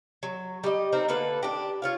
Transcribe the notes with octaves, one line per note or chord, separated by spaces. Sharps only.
F#3
G3 D#5
C4 D#4 A#4
D3 A#3 A4 B4
D4 G4
F4 C#5 F5